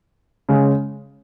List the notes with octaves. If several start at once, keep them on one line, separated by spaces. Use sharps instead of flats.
C#3 G#3 C#4